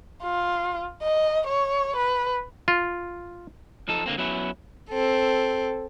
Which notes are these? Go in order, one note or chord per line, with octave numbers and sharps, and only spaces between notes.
F4
D#5
C#5
B4
F4
F3 D#4 A4
D3 A#3 C4
F#3 B3 C#4 E4
C4 A4